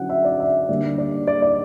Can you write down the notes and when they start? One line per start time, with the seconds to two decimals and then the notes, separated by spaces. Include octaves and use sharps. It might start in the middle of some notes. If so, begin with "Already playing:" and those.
Already playing: D3 F#3 C#4 E4 F#5
0.09 E5
0.25 D5
0.40 E5
0.69 D3 G3 A#3 D4 D5
0.98 D5
1.27 D5
1.42 D5